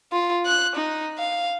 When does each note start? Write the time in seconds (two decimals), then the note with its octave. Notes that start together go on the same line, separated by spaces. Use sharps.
0.12 F4
0.46 F#6
0.76 D#4
1.18 F5